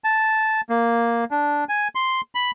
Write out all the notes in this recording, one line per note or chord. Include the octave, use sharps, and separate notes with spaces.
A5
A#3
D4
G#5
C6
B5